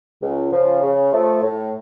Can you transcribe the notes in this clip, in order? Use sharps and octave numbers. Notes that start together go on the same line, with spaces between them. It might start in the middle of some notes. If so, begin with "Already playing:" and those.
C#2
C#3 F3
C#3
F3 A3
A2